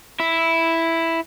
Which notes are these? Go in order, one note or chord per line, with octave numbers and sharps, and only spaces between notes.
E4